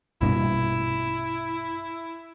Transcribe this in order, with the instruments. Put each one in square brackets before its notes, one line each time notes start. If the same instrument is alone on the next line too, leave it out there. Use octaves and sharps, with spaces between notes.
[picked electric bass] A#1 G2 B2 [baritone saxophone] E4